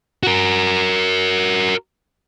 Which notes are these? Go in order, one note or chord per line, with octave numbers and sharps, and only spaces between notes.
F#4 A#4